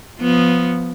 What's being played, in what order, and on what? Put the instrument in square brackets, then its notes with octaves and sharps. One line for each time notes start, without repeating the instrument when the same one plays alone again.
[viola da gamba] F3 B3